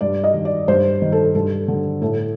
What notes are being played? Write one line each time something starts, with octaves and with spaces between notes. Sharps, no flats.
G2 D5
D#5
D#3
D5
G2 C5
D#3
A4
G2 A4
D3
A2 A4